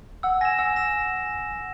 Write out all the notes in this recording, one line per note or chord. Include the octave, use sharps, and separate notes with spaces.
F#5 E6
G#5 A#6 E7
F#5 E6
A#6 E7